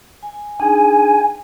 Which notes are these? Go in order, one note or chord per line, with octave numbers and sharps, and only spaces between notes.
G#5
D4 D#4 G#4 G#5